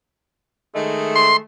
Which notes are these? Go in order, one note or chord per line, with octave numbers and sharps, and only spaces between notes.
D#3 G#3 A3
C6